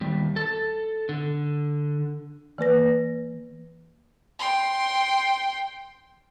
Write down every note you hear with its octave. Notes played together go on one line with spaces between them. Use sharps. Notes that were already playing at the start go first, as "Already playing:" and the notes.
D#2 G3
A4 A5
D3
E3 A#3 B4 A#6
G5 C6